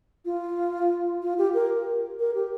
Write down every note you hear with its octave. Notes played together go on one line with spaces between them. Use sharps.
F4
F4
G4
A#4
A#4
G4